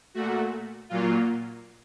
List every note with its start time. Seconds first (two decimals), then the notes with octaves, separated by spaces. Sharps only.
0.14 A#2 A3 F#4
0.89 A#2 F#3 A#3 F4